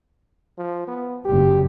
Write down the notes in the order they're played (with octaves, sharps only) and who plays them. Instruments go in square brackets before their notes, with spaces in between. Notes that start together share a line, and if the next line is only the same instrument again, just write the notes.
[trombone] F3
B3
[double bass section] F#1 G2 [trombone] G4